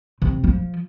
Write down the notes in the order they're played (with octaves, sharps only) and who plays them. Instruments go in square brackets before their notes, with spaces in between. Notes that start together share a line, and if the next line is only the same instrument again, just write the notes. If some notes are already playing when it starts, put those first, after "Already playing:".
[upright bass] C3
F3